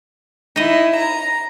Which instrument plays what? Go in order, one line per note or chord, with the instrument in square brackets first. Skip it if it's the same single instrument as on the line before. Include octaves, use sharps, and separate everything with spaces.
[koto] D#4 D#5 [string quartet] E4
[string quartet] A#5